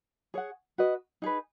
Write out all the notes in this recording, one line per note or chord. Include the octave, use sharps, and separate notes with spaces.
G#4 C#5 F#5
F#4 B4 D#5
D#4 G#4 B4